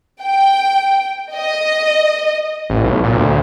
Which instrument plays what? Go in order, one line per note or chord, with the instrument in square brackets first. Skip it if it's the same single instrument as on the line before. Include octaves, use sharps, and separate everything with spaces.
[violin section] G5
D#5
[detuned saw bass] A1
B1
A#2
D2